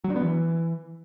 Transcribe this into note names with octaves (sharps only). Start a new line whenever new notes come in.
F#3
D4
B3
E3